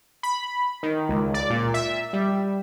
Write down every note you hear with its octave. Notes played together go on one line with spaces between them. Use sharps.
B5
D#3
C#2
D5
A#2
E5
G3